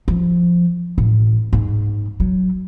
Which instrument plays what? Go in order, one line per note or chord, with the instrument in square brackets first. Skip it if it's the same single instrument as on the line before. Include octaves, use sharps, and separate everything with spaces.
[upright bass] F3
A1
G#2
F#3